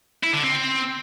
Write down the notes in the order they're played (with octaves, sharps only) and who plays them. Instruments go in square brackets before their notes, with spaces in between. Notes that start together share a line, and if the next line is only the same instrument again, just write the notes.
[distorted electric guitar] E4
D3
C4